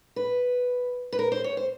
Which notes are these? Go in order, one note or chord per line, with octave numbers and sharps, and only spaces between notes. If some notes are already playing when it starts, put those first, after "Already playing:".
B4
B4
A#4
C5
C#5
C5